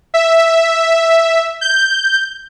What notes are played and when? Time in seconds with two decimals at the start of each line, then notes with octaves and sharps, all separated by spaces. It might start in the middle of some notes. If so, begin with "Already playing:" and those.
0.14 E5
1.61 G6